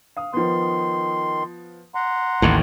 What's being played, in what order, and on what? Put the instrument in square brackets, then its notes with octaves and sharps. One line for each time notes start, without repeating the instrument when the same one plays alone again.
[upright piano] F5 D#6
[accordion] D#3 C6 [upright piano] F3 B3
[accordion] F#5 A#5 C6
[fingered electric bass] A1 D#2 A2 [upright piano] G5